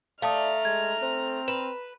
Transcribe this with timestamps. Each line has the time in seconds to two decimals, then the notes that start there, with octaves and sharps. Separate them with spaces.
0.22 A3 D5 F5 A5 A#5 D#6 F6
0.65 G#3 G#6
1.02 C4 C5
1.48 B4 E7